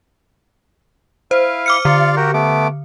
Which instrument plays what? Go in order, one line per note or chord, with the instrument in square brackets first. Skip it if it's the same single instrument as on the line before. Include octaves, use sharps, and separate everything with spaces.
[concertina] E4 F5 [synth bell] C5
[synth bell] D6 F6 C#7
[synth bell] D3 [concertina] F4 D5 F5
[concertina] F#4 G4 A#4
A3 B3 D6